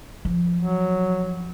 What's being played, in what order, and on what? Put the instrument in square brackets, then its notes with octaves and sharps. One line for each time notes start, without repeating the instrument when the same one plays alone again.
[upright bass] F3
[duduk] F#3